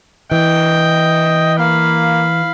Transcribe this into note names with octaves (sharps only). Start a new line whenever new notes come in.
E3 D#5 G5
A#3 F5 B5